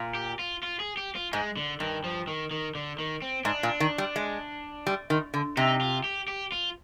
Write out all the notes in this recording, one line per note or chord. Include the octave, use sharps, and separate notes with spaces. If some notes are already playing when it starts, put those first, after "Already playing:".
Already playing: A#2
G4
F4
F4
G#4
G4
F4
G#2 G#3
D3
G2 D#3
F3
D#3
D#3
D3
D#3
C4
G#2 D4
A#2
D#3
G3
G#3
G3
D#3
D3
C3 D#4
F4
G4
G4
F4